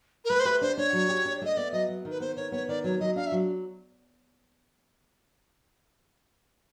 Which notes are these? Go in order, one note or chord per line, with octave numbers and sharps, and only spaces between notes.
A#4
A3 B4
C5
G4 B4
D4 C5
D4 C#5
F#3
G4
D4
A3 D#5
B3 D5
F#3 D#5
F#3
D#3
B4
B3 C5
D#3 C#5
B3 C#5
D#3 D5
F#3 C#5
F#3 D#5
D4 F5
E5
F#3